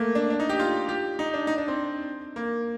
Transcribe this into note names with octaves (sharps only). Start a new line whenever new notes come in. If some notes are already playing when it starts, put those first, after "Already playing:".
Already playing: A3 A#3
D4
D4
D#4
G4
F4
G4
D#4
D4
D#4
D4
C4
A#3